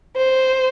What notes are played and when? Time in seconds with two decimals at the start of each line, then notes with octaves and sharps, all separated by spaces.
0.17 C5